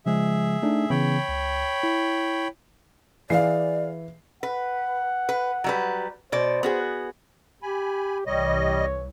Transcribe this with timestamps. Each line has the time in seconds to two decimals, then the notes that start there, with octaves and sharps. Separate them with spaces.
0.06 C#3 F3 G#3 G#4 E5
0.63 A3 D4 D#4
0.90 C#3 E3 B3 C#5 G5 B5
1.29 C#2
1.83 E4
3.30 E3 G#4 D5 F5 C7
4.43 B4 F#5
5.29 B4
5.64 F#3 G3 B4
6.32 B2 C5 D5
6.63 B3 F#4 G#4
7.63 G4 G#5 B5
8.26 C2 E3 G3 C#5 D#5